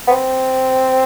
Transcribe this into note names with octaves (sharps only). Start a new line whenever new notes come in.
B3
C4